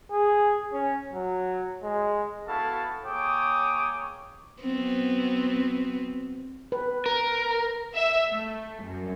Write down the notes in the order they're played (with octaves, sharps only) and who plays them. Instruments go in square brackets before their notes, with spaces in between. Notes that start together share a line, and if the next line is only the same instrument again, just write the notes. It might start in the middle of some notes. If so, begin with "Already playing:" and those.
[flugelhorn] G#4
C#4
F#3
G#3
[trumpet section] B3 E4 F#4 A4 F5 A5
A#3 G#4 C#5 G5 D6 D#6
[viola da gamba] F#3 B3 C4
[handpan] B4
[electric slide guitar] A#4
[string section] E5
A3
F#2